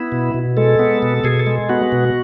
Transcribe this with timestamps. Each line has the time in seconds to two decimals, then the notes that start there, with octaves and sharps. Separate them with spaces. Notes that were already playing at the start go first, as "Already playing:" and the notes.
Already playing: B3 E4
0.12 B2
0.34 B2
0.57 G#3 A4
0.79 B3
1.02 B2
1.24 B2 G#4
1.39 A4
1.47 G#3
1.69 B3 F#4
1.92 B2